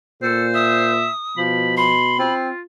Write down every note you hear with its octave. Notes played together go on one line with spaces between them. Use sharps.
A#2 A4 C5
E5 D#6
B2 F3 B5
B5 C6
C4 F4